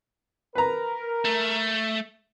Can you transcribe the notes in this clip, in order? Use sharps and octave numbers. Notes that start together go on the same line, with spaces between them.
A#4 B4 A#5
A3